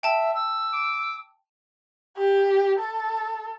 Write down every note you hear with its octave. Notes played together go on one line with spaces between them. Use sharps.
E5 G5 A5
E6
D6
G4
A4